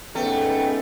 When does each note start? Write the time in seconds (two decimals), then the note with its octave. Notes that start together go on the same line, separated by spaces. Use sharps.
0.15 G#2 A3 B3 C#4 G5